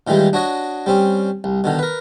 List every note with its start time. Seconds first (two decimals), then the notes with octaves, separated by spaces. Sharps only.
0.07 A#2 D#3 E3 G3 G#3
0.33 D4 F#4 C#5 D#5
0.86 G3 C4 C#4
1.44 C2
1.64 B2 D3 D#3
1.79 A#4 B4